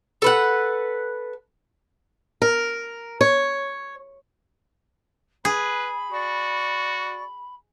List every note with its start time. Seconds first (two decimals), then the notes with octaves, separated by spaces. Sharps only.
0.22 A4 B4 F#5
2.42 A#4
3.21 C#5
5.45 G#4 B4 B5
6.11 F#4 D5 C#6